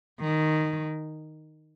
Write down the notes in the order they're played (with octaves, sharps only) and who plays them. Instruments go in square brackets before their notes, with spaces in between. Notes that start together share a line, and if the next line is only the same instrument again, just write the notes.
[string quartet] D#3